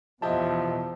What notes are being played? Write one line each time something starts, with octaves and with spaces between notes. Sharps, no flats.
E2 B2 F3 E4 G4 D#5 A5